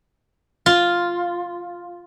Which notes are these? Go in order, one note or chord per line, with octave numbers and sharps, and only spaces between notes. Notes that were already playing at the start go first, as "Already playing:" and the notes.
F4